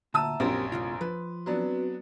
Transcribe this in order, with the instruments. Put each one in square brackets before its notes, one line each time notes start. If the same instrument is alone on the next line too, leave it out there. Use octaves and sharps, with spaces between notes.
[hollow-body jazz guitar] D2 A#2 [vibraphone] E5 F#5 A#5 [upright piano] A5 E6 D#7
[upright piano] A#1 F#2 [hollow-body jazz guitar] C4 G4 A#4 [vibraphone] C6
[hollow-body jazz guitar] A2 C3 F4
[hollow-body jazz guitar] F3 [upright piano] B4
[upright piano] F#3 B3 D4 [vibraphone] C4 F#4 B4